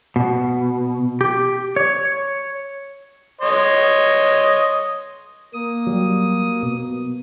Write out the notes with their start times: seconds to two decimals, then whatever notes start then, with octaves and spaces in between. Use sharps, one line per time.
0.16 B2
1.21 G4
1.76 C#5
3.41 C#5 D#5 C6
5.54 A#3 D#6
5.87 F#3 G3
6.63 B2